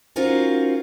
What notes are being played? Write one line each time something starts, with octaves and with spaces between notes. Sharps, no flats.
C#4 D#4 F4 F#4 A#4 C5